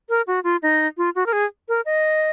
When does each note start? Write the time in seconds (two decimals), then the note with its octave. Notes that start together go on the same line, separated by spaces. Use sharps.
0.09 A#4
0.27 F#4
0.44 F4
0.62 D#4
0.97 F4
1.15 F#4
1.26 A#4
1.33 G#4
1.69 A#4
1.86 D#5